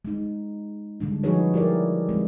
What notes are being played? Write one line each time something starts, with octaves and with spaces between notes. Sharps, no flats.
G#3 D#4
D3 G3 G#3 D4
F3 D#4 F#4 G#4 B4 C#5
E4 G4 A#4 D5
G#3 C4